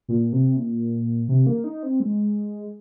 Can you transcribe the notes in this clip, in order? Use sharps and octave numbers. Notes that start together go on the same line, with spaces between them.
A#2
C3
A#2
C3
A#3
D#4
C4
G#3